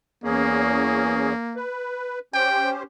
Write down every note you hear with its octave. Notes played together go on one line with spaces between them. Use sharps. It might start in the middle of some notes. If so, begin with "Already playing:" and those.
E2 A#3 C#4 G#4
B4
C#4 G4 C5 G5